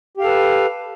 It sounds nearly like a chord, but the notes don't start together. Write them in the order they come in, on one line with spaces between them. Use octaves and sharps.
G4 F5 A4 B4